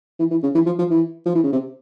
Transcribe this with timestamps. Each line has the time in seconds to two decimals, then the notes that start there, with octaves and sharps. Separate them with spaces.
0.19 E3
0.31 E3
0.43 C#3
0.55 E3
0.66 F3
0.79 F3
0.90 E3
1.26 F3
1.35 E3
1.43 C#3
1.52 C3